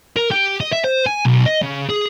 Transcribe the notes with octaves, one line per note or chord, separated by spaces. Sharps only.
A#4
G4
D#5
E5
C5
G#5
B1
D#5
C#3
G#4